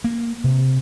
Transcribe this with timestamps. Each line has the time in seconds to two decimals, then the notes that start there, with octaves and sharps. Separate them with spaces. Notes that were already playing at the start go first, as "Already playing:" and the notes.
0.04 A#3
0.44 C3